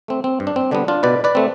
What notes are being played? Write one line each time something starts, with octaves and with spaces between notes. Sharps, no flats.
A3 C4
C4
G2
D4
C4
D3 G3 B3 D4
D4 F4
B2 B4 D5
B4 D5
A3 C4